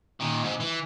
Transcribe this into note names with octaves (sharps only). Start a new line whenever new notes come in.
A#2 D#3
G#2 C3
E3